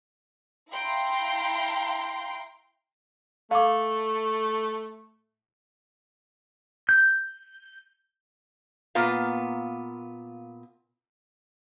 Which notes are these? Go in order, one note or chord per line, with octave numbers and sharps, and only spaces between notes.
E4 F5 G5 A#5 C6
A3 F5 D6
G6
A#2 A#3 B3 F4 F5